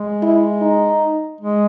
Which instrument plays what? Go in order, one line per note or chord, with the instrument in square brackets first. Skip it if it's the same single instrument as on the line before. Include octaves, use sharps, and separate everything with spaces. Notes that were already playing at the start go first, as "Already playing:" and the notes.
Already playing: [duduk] G#3
[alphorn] E4
D#4
[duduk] G#3